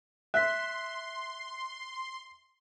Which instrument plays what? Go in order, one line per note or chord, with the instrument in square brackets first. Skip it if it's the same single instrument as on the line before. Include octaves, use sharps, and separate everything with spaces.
[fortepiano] E5 [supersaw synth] C6 [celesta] F#6 B6